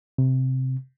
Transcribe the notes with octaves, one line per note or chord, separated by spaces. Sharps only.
C3